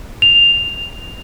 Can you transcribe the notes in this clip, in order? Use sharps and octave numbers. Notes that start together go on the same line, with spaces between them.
F7